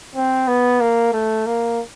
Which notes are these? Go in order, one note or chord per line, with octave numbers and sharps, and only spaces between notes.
C4
B3
A#3
A3
A#3